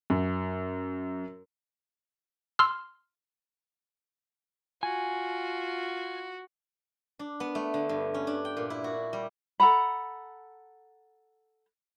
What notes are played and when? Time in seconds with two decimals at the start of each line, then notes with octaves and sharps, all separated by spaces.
0.10 F#2
2.59 C6 E6 F6
4.83 F4 F#4 G#5
7.19 D4
7.40 B3
7.55 A3
7.74 D3
7.89 G2
8.14 C#4
8.27 D4
8.45 G5
8.57 A#2
8.70 E4
8.84 F#4
9.13 G3
9.60 A4 F#5 A#5 B5